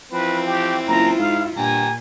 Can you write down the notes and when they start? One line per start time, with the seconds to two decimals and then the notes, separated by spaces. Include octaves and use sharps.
0.12 E3 F3 C4 B4
0.47 G4
0.87 F#1 E4 F4 A#5
1.19 G#2 F5
1.57 G2 A#2 G4 G#5 A#5